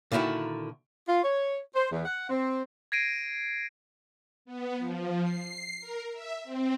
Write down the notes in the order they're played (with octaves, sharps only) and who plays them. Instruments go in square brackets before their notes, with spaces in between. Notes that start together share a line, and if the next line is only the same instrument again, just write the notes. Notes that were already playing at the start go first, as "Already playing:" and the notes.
[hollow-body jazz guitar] A#2 D3 D#3 E4 F#4
[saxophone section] F4
C#5
C5
E2
F#5
C4
[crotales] G#6 A#6 C7 D7 D#7
[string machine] B3
F3
C7
A#4
E5
C4